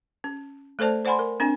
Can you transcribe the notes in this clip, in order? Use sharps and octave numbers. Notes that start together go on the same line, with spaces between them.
C#4
A3 A4 C5 D5 A5
C5 D5 F#5 G#5 B5 C6
A#4
C4 D4 G#5